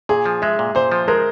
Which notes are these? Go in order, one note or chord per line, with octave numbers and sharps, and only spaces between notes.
A#2 G#4
F3
G#3 E5
A#2
A#2 C5
F3
G#3 A#4